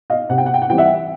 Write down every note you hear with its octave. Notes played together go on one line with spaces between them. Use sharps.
D#5 F5
C3 F#5
G5
F#5
G5
F#5
E3 G3 C4 G5
E5 F#5